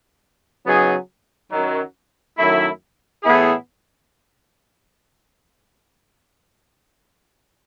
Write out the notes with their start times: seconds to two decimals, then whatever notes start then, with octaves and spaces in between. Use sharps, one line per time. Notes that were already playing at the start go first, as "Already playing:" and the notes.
0.65 C#3 F#3 B3 D#4 G#4
1.51 F#2 D#3 F#3
2.37 F#2 D#3 F#3 A3 E4
3.22 A2 E3 B3 E4 G#4